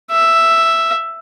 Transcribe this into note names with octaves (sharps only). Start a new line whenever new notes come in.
E5